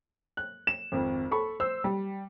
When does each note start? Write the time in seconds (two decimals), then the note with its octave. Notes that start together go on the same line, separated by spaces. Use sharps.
0.37 F#6
0.67 E7
0.92 G#1 F2
1.31 A4 B5 C#6
1.60 C5 E6
1.84 G3